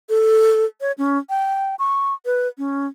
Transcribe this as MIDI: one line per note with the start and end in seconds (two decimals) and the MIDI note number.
0.09 0.65 69
0.81 0.92 73
0.98 1.18 61
1.30 1.75 79
1.79 2.14 85
2.26 2.48 71
2.58 2.87 61